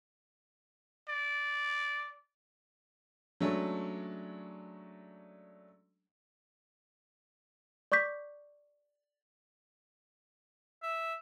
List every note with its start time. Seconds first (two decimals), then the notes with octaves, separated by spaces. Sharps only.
1.09 D5
3.41 F#3 G#3 A3 C#4 D4
7.92 D5 C#6 D6 G6 B6
10.83 E5